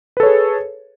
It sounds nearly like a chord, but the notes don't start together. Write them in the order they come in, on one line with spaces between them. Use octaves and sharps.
B4 A4 C#5 G#4